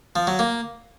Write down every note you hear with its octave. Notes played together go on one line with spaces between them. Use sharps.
F3
F#3
A#3